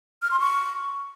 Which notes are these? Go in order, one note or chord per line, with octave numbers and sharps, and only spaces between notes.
F6
C6
C#6